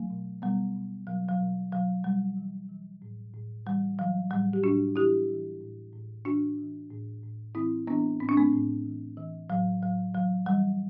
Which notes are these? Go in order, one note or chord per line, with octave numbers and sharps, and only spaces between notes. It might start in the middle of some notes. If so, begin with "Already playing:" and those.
Already playing: F#3 A3
B2
B2 G3 B3
B2
B2 F#3
F#3
B2
B2 F#3
B2 G3
E3
E3
A2
A2
E3 G3
E3 F#3
A2 G3
G4
A2 D4 F#4
E3 E4 G4
E3
A2
A2
E3 D4 F#4
E3
A2
A2
E3 C4 E4
E3 B3 D4
A2 C4
D4
A3 C4
A2
E3
E3
A2 F#3
A2 F#3
E3 F#3
E3 G3